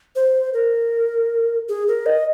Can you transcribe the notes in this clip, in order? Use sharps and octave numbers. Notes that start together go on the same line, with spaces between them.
C5
A#4
G#4
A#4
D#5